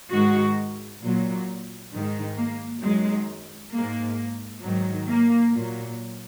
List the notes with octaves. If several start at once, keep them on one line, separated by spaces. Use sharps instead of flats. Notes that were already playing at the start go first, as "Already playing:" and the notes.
G#2 D#3 G#3 F#4
A#2 F#3
G#2 D#3 G#3
A#3
F#2 D#3 F#3 G#3
G#2 G#3 A#3
G#2 D#3 F#3
A#3
A#2 F#3